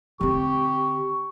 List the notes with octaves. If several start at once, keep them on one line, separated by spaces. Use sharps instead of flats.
D3 C4 G4 C#6